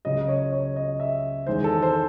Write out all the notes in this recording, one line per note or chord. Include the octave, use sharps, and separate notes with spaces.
C#2 C#3 F#3 D#5
C#5
C#5
D#5
E5
E2 D#3 G#3 C5
A4
C5